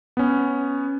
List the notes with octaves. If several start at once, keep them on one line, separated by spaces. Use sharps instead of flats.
B3 C#4